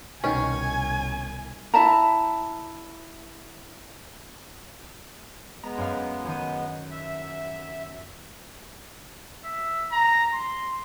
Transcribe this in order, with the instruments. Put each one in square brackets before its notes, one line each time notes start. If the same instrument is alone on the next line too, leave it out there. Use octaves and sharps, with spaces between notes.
[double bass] C2 [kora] B2 D#3 [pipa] C#4 [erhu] G#5
[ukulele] E4 E5 A5 A#5
[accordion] G#3 B3 [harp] A#5
[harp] F#2 F5
F#2 D#3 D#7
[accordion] E5
[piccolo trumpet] E5
A#5
C6